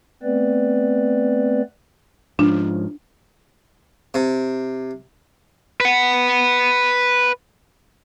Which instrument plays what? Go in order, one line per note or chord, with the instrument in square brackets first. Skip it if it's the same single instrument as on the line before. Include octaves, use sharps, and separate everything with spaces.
[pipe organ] A3 B3 C4 B4 D5
[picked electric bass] G#2 F3 [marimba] D4
[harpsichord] C3
[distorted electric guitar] B4 F#5